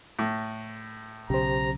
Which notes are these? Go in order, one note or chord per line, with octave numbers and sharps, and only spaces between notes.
A2
B1 C#3 G4 C5 A#5